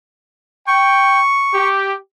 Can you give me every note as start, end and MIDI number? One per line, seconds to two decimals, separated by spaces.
0.68 1.21 79
0.68 1.68 85
1.54 1.96 67